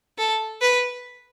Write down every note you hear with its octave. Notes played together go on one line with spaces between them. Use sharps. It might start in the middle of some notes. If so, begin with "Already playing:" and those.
A4
B4